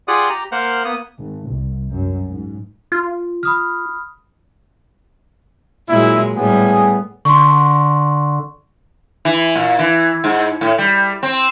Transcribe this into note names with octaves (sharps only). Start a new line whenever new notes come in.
F4 G4 G#4 D5 F#5 D#6
G4 A#5
A#3 A#4 C5 F5 F#5
A#3 B3 D#6
G#1
C2
F#2
G#2
F4
B5 D#6 F6
A#2 F#3 G#3 E4
A2 G3 B3 G#4
D3 C6 C#6
E3
A#2
E3
G#2
A2
G3
C4